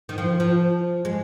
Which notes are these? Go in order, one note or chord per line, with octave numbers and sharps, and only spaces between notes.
D#3
F3
F3
G#3